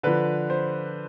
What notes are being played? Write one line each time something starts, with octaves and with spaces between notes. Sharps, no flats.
D3 F3 B4
C5